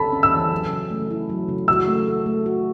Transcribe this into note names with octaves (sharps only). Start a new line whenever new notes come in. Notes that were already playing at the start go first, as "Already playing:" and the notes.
Already playing: A4 A5 B5
C#4
E6
E3
F#3
C#3
A3
E4
F#3
C#3
F#4 E6
A3
A4
A3
F#4